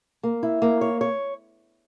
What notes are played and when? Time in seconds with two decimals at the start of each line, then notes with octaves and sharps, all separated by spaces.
0.23 A#3
0.43 E4
0.62 A#3
0.81 C#5
1.01 C#5